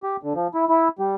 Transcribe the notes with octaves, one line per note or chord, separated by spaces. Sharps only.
G4
D3
F3
E4
E4
G3